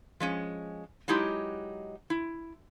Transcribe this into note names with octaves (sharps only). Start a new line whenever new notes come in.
F3 G#3 C#4
F#3 G#3 D#4 E4 G4
E4